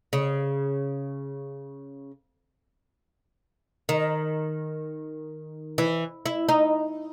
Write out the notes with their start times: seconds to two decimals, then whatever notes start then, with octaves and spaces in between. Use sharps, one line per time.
0.13 C#3
3.89 D#3
5.78 E3
6.26 E4
6.49 D#4